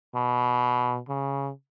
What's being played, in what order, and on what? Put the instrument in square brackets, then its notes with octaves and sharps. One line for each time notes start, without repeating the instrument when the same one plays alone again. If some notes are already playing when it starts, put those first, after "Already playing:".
[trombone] B2
C#3